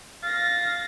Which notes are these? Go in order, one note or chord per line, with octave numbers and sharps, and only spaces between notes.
F5 A6 A#6